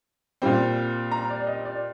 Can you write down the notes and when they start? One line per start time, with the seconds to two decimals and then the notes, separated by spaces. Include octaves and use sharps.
0.42 A#2 G3 C4
1.11 A#5
1.30 D5
1.47 D#5
1.65 D5